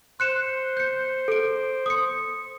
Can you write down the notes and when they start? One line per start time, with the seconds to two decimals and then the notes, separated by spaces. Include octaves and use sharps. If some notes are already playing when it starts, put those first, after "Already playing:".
0.20 C5 F#6 C#7 E7
0.77 G6 C#7
1.28 A4 D7
1.86 D#6 C#7